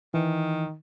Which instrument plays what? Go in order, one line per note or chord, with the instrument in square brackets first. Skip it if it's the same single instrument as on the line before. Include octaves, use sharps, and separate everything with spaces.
[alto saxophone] D#3 [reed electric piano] E3